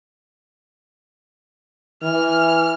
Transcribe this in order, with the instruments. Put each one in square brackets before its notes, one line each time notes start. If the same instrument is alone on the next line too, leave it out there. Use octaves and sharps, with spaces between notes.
[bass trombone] E3 [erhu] F6